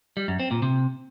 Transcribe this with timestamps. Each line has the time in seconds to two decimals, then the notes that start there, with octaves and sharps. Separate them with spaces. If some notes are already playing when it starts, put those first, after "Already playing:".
0.17 G3
0.28 F#2
0.40 C4
0.51 A#2
0.62 C3